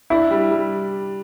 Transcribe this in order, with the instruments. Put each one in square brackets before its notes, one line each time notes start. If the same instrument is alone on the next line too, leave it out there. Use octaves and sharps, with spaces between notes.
[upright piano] D4 [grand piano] E4
[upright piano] G3
G3